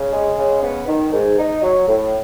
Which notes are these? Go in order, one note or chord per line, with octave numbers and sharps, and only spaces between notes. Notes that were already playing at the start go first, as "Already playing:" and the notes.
Already playing: C#3
G#3
C#3
B3
D#3
G#2
D#4
F#3
A2